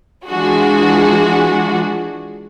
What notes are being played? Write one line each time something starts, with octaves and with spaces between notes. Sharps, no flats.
E3 G#3 D4 F4 F#4 G#4